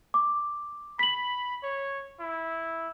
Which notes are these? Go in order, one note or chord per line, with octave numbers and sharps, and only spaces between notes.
D6
B5 B6 F#7
C#5
E4